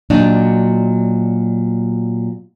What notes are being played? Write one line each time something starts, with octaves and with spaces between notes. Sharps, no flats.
A#2 F#3 D4 D#4 F#4